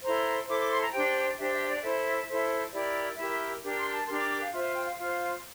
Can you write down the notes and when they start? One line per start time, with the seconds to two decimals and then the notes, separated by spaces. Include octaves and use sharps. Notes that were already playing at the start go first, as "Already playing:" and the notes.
0.03 E4 A4 C5 A#5
0.47 E4 A4 C5 D6
0.59 D6
0.70 C6
0.81 A#5
0.92 D4 G4 C5 G5
1.37 D4 G4 C5 E5
1.52 E5
1.68 D5
1.82 E4 A4 C5 E5
2.28 E4 A4 C5
2.72 E4 G4 A#4 D5
3.17 E4 G4 A#4 E5
3.63 D4 G4 A#4
3.78 C6
3.92 A5
4.07 D4 G4 A#4 C6
4.18 D6
4.30 D6
4.41 F5
4.52 F4 C5 E5
4.64 E5
4.75 G5
4.86 F5
4.97 F4 C5 F5